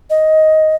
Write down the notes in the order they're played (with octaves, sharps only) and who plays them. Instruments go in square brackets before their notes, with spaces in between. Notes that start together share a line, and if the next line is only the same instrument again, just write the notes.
[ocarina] D#5